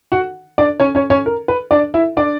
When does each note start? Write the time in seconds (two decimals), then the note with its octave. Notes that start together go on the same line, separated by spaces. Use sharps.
0.12 F#4 F#5
0.58 D4 D5
0.80 C#4 C#5
0.95 C#4 C#5
1.10 C#4 C#5
1.26 A#4
1.48 B4
1.71 D4 D5
1.94 E4 E5
2.17 D4 D5